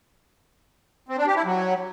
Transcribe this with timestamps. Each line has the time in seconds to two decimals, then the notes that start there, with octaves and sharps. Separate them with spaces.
1.09 C4
1.18 D4
1.27 G4
1.36 E4
1.45 F#3